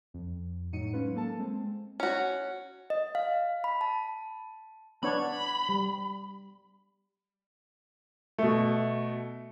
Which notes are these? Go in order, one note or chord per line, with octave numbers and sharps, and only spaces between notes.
F2
A2 F#3 D#4 C#7 D#7
F#3 G#3 C#4 F4 B4
A#3 A4 A5
G#3 C4
C#4 F#4
D#5
F5
B5
A5
B3 D4 C#5 B5
G3
B2 A3